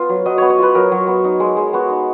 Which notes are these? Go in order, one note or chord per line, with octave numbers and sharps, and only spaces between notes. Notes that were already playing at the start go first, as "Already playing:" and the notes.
Already playing: B3 F4
F#3
F#3 D#5
B3 C#5
C#5
F4 B4
F#3 A#4
F#3
B3
D#4
G#3
G#3
B3 F#4
D#4